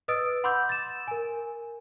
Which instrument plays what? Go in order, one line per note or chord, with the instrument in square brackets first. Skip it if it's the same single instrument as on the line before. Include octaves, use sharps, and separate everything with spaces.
[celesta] B4 D#5 D#6 E6 A6 D7
F#5 B5 C6 D6 E6 G6
A6 E7
A#4 G#5